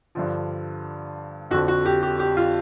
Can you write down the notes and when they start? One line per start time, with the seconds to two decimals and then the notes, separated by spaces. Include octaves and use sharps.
0.15 G2 D3 F3
1.51 F2 D3 F3 F#4
1.68 F#4
1.85 G4
2.02 G4
2.19 G4
2.37 F4